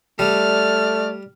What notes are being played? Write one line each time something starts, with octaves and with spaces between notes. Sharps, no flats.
G3 A3 D5 F6